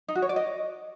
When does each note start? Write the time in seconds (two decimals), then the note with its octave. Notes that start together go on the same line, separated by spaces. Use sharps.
0.08 D#4
0.15 F#4
0.22 C#5
0.29 D5
0.36 D#5